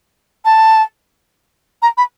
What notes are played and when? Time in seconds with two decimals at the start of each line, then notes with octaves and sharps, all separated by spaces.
0.45 A5
1.82 A#5
1.97 B5